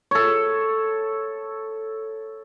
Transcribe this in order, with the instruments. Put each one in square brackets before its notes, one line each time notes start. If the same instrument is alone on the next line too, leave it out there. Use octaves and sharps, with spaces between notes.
[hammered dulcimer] A4 C#5